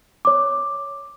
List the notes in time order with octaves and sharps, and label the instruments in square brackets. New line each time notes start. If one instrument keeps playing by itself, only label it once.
[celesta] C#5 D6